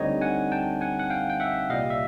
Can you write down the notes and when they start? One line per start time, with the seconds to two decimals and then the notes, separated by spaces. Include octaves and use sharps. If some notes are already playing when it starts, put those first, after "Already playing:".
Already playing: D2 D3 G3 C4 D#4 C#5 D#5
0.21 F#5 G#5
0.52 G5 A5
0.81 F#5 G#5
0.99 F#5
1.10 F5 G5
1.30 G5
1.40 E5 F#5
1.70 C2 A#2 G3 D#5 F5
1.90 E5